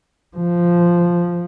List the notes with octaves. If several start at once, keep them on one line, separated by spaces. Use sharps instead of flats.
F3